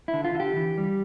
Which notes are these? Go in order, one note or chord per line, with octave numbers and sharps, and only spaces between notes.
E4
D3
F4
D3
G4
E3
G3